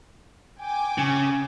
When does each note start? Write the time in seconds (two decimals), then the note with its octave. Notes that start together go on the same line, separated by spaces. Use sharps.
0.60 G5 G#5 D6
0.98 C#3